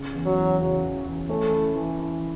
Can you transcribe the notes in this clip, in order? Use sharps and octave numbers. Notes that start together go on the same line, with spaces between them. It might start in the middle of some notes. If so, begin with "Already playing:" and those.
Already playing: C#3
E2
F#3
E3
C#3
E3
E3
A3 C#4
E4
E3
E4